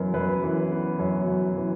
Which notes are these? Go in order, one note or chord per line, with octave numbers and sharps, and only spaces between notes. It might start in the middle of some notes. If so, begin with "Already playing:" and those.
Already playing: F#2 E3 B3 A#4
F#2 B4
E3
B3
F#2 C#5
F#2
E3